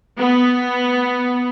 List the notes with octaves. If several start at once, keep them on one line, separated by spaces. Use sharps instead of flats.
B3